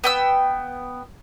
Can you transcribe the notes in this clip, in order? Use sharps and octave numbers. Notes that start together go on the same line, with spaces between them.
B3 G5 E6